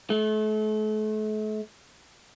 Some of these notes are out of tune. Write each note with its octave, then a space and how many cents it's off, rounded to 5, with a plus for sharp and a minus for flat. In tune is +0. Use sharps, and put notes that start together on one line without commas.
A3 -40